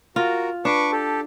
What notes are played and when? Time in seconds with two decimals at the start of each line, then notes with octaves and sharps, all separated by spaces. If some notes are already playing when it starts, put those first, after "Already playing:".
0.16 F4 F#4 A#4
0.65 D4 B4 C#6 D6
0.92 G4 A4